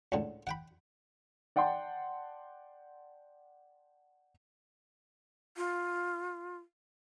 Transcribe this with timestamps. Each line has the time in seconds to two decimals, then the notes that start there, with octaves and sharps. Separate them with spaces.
0.12 C#2 A2 D3
0.47 F#5 G5 B5
1.56 D5 F#5 G5 A5 C6
5.57 F4